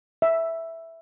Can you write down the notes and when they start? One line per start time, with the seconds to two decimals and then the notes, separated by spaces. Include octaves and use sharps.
0.22 E5